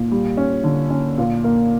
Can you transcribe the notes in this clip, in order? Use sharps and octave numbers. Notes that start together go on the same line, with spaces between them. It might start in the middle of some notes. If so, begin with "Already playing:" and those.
Already playing: A#2
G3
C#4
D3
C#4
A#2
A#3